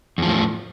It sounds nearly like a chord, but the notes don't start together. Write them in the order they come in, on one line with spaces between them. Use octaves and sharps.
E2 F3 A2